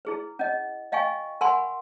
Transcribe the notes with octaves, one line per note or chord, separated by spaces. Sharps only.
E4 G#4 B4
C#4 D#5
D#5 F5 G5 G#5 C#6
A#4 F#5 G#5 B5 C6